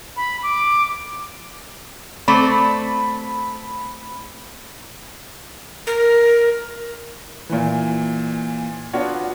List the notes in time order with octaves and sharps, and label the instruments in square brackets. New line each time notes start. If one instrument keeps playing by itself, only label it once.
[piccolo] B5
D6
[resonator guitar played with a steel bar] A3 C4 D5 [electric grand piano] B5
[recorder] A#4
[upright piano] A#2 E3
B3 D4 F4 F#4 C#5